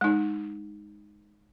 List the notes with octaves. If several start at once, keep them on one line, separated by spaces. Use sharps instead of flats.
G#3 D#4